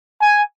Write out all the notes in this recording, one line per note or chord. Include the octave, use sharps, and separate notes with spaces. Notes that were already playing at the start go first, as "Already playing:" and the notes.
G#5